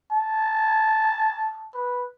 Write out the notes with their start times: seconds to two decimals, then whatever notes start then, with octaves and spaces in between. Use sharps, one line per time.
0.12 A5
1.74 B4